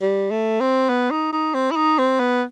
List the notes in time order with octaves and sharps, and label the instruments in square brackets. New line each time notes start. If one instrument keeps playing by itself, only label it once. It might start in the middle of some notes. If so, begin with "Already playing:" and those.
[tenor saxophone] G3
A3
C4
B3
D#4
D#4
C4
E4
D#4
C4
B3